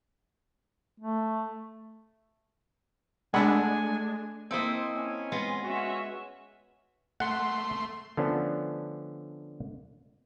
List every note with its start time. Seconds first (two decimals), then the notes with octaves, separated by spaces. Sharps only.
1.00 A3
3.34 G#3 A3 D4 F#5 G#5 B5 E6
4.51 A#3 C4 E4 A4 C5 D#5
4.96 C#4 G#5
5.32 G#3 B3 F4
5.64 C#4 F#4 E5
7.20 A3 F#5 C6
8.17 D3 F3 A3 B3 C#4 D4